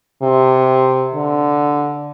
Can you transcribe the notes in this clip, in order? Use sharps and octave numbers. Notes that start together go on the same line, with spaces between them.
C3
D3